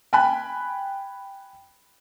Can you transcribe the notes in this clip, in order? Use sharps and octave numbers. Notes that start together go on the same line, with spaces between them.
G5 G#5 B5 F#6